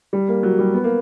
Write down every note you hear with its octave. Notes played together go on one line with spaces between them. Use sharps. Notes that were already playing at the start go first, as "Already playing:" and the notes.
G3
A#3
F#3
G3
B3
A#3